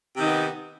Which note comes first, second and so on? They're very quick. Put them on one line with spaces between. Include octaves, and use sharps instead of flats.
C3 D#3 D#4 B3